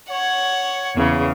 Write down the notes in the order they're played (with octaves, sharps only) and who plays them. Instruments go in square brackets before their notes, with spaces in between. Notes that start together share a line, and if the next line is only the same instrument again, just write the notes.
[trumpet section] C#5 [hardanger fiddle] F#5
[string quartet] E2 C#3